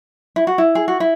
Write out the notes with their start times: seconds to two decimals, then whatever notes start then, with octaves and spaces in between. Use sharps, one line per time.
0.36 E4
0.47 F#4
0.58 E4
0.75 G#4
0.88 F#4
1.00 E4